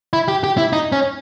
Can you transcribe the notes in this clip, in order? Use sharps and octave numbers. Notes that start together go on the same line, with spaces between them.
E4
G4
G4
E4
D#4
C#4